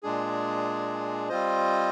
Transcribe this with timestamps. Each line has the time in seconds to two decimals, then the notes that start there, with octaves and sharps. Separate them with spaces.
0.03 A#2 G#3 D4 G#4
1.29 G3 C4 F4 C5 D#5